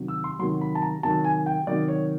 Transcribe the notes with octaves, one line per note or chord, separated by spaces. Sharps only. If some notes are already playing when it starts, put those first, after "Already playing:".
Already playing: C3 D#3 F#3
E6
C6
C3 D#3 F#3 C6
B5
A5
A#5
C3 D#3 F#3 A5
G#5
G5
C3 D#3 F#3 D5
C#5